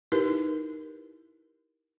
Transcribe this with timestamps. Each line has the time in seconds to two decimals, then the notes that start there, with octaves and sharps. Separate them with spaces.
0.12 D#4 E4 G4 A#4 B4